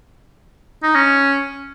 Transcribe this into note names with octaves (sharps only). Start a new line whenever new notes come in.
D#4
C#4